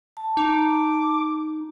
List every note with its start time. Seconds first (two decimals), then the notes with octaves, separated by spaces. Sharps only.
0.17 A5
0.37 D#4 D6